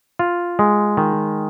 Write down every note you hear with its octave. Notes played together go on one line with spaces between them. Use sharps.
F4
G#3
D#3